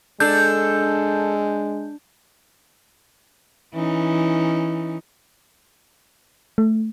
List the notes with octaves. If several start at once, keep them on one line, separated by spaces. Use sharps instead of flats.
G#3 D4 A4 G6
E3 C#4 D#4
A3